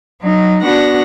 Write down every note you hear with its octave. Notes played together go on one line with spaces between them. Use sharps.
F#3 D#4
B3 D4 F#4 F#5 A#6